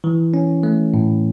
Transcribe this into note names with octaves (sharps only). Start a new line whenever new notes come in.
E3
C#4
A3
A2